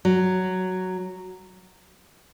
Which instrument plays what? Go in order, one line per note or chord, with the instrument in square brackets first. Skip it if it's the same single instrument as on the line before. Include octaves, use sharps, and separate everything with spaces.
[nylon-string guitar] F#3